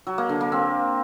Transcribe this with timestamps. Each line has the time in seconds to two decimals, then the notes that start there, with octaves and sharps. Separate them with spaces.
0.07 F#3
0.18 A#3
0.29 D3
0.41 A#3
0.52 C4